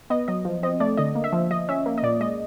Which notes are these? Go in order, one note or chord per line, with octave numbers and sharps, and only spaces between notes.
B3 D#5
F#3 D#5
F3
C4 D#5
A3 D5
D3 D#5
A#3
E5
F3
F3 D#5
C#4 E5
A#3
D#5
A#2 D5
G#3 D#5